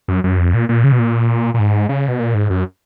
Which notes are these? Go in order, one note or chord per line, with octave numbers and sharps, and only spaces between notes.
F#2
F#2
F2
A#2
A#2
C#3
B2
A#2
A#2
G#2
C#3
B2
A#2
G#2
F#2